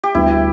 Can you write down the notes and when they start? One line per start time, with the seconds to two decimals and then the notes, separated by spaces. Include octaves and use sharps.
0.03 G4
0.15 D2 D3 G3 B3 E4